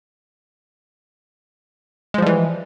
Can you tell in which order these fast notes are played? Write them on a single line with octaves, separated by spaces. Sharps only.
G#3 F3 G3 E3